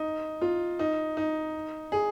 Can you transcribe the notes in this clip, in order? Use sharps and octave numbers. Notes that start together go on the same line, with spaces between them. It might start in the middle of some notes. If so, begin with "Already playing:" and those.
Already playing: D#4
F4
D#4
D#4
G#4